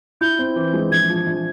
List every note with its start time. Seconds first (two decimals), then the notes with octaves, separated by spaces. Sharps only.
0.21 E4 G6
0.39 C4
0.56 E3
0.74 G#3
0.91 A#1 G#6
1.09 F3
1.27 A#1